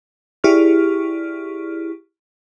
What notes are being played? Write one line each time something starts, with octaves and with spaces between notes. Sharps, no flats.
E4 G4 G#4 D5 C#6 F6